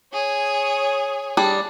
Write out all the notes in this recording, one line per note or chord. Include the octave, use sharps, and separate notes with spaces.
G#4 C#5
G3 D4 G#4